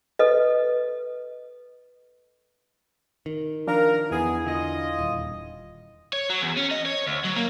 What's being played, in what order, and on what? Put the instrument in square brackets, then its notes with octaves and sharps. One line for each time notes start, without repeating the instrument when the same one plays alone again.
[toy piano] A4 B4 D#5
[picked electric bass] D#3
[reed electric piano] F3 D4 F5 [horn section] A#4
[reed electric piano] E2 E4 [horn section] B3 G#4
[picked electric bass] D3 [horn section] F4 D#5
[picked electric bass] D#1
[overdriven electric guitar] C#5
F#3
E2
C#4
D#5
C#5
D2
F#3
A#3